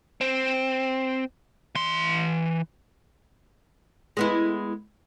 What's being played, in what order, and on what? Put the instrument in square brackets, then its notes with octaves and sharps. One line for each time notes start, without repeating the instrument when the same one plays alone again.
[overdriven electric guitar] C4
E3 C6
[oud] G#3 B3 E4